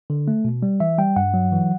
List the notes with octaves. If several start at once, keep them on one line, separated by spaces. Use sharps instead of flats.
D3
A3
B2
G3
E3 E5
G3 G5
G2 F#5
F#3
E3